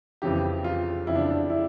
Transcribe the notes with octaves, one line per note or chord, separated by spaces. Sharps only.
F2 C#3 E3 G4
F4
F2 C#3 E3 E4
D4
D4
E4